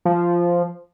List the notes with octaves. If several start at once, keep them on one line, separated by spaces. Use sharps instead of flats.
F3